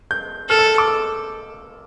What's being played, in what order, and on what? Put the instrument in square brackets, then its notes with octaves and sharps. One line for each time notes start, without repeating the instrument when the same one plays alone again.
[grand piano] G6
[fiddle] A4 [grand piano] F6
[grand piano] E6
D6
E6